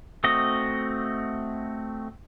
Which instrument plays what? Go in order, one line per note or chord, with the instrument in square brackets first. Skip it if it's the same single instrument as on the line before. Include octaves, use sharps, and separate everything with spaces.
[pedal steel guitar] A3 C4 F#4 D#5